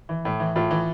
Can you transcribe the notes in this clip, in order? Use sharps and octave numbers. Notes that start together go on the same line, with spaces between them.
E3
A2
E3
A2 F4
E3